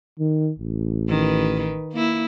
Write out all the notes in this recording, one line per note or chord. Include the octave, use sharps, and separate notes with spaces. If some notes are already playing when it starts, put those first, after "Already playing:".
D#3
A1
D#3 B4
A#3 E4